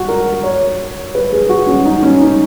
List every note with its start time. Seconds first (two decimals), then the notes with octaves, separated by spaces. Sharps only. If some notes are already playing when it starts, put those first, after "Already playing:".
Already playing: F#4
0.08 A#4
0.44 C#5
1.15 B4
1.33 G#4
1.49 F#4
1.67 C#4
1.85 D#4
2.03 C#4
2.21 D#4